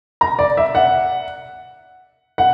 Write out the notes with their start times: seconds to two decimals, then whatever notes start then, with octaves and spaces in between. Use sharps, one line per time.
0.21 A#5
0.39 D5
0.57 E5
0.75 F#5
2.38 F#5